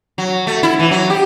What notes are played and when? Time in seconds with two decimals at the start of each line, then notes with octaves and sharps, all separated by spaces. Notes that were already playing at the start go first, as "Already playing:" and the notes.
0.18 F#3
0.47 A3
0.63 E4
0.79 E3
0.91 F#3
1.10 G4